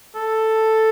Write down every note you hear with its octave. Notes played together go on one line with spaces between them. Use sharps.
A4